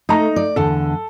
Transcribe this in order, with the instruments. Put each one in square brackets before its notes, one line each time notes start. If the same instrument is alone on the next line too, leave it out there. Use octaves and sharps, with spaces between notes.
[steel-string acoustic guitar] A3 [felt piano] D#4 A#5
[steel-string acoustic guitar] D5
[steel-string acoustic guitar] E2 D3 [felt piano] A4